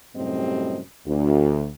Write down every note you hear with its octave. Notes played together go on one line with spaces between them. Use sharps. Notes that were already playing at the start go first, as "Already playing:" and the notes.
F#2 A2 C3 G3 C4 D#5
D2